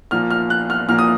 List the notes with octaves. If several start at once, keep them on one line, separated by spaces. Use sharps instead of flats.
A#2 F3 A#3 F6
F6
F#6
F6
A#2 F3 A#3 F6
D#6